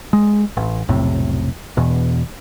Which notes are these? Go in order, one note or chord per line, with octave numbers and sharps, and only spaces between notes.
G#3
A1
B1 F2 A2 C3
E2 B2